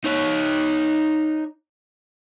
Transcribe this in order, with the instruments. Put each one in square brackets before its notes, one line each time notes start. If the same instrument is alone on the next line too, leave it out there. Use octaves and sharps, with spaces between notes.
[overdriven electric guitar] D#4 C#5